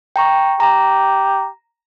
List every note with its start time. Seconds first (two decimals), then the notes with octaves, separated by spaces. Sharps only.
0.16 G5 A#5 C#6
0.60 G4 A#5